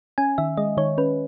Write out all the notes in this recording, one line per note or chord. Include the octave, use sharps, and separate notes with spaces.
C#4 G#5
D#3 E5
G#3 D#5
D#3 C#5
C#4 B4